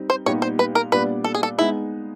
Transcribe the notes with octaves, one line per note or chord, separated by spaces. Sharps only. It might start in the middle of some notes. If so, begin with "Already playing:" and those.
Already playing: G3 C4 D#4
C5
A#2 G3 B3 D#4 G4 C#5
C5
B4
A#4
A#2 G3 B3 D4 B4
A4
G#4
A4
G#3 B3 D#4 E4